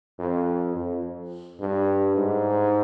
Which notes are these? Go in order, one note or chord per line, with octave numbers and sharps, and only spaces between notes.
F2
F2
G2
G#2